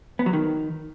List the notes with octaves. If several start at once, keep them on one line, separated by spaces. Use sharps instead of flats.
B3
F#3
D#3